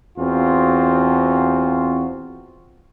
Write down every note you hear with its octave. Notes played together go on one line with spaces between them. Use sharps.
E2 C4 F4 F#4